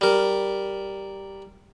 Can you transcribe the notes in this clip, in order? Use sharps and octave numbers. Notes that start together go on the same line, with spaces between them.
G3 A#4